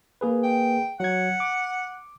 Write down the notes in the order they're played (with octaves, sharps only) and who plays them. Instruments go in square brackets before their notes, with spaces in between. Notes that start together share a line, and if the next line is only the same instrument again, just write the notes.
[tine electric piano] A#3 G#4 B4
[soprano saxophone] G5
[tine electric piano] F#3 G#6 [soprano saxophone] F#5
[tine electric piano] D6